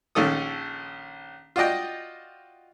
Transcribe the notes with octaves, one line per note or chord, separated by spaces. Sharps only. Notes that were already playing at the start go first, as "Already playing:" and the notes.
A#1 D#3 C#4 A4 D#6
F4 F#4 D5 D#5 G5